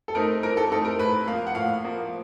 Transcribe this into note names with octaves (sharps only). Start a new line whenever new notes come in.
A4
A3 C4 D#4 A#4
E3 A#4
A4
A3 C4 D#4 A4
A#4
A2 B4
F3 A#3 F5
F#5
A2 F5
F3 A#3